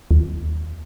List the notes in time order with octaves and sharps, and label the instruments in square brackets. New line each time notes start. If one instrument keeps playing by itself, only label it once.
[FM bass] D#2